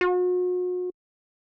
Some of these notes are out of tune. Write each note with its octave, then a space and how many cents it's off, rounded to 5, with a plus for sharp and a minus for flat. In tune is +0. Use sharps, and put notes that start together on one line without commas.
F#4 -40